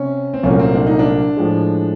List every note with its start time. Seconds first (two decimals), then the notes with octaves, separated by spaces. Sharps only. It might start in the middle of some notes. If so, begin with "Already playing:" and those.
Already playing: C3 C#4
0.34 C4
0.43 C2 A#2 F#3 A3 C#4
0.59 C4
0.75 D4
0.87 D#4
0.99 D4
1.37 A2 F3 G#3